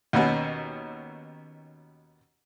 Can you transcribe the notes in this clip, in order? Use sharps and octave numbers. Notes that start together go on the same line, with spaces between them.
D#2 B2 B3 C#4 F#4